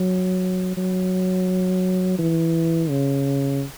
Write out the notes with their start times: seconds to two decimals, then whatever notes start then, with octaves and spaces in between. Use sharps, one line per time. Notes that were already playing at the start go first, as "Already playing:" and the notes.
Already playing: F#3
0.77 F#3
2.18 E3
2.89 C#3